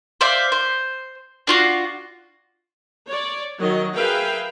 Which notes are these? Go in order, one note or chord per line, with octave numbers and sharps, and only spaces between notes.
C5 D5 E5 F5
C5
D4 F4 F#4
C#5 D5
D#3 F#3 D#5
G#4 A#4 B4 E5 F5 G5